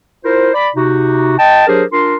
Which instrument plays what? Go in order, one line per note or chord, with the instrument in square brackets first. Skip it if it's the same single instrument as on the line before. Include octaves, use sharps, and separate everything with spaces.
[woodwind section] E4 F4 A#4 C5
D5 B5
C3 D#4 F#4
D#5 G5 A5
F#3 D4 G4 G#4 A#4 C5
D4 F4 A#4 C6